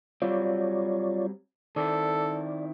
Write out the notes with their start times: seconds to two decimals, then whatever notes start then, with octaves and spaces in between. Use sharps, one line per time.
0.22 F#3 G3 C4 F4 C#5 D5
1.76 D#3 C4 E4 A4 D5